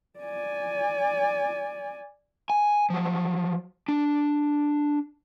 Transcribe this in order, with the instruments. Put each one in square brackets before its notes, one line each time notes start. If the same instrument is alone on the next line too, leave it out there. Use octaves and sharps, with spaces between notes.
[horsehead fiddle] D5 G#5
[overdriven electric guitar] G#5
F3 F#3
D4